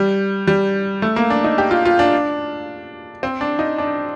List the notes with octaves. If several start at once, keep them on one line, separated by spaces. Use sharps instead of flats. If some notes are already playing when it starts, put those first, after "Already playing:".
Already playing: G3
G3
A3
A#3
D4
D#4
G4
F4
F4
D4
C4
D4
D#4
D4